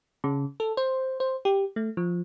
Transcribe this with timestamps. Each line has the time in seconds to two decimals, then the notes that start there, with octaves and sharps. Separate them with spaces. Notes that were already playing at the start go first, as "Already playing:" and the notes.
0.24 C#3
0.60 A4
0.77 C5
1.20 C5
1.45 G4
1.76 A3
1.97 F3